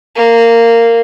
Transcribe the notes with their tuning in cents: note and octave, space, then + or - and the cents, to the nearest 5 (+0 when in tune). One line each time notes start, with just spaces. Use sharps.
A#3 -15